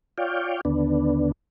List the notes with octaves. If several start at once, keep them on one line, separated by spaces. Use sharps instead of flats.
F4 C#5 D5 F5 G5
D#2 D3 B3 D4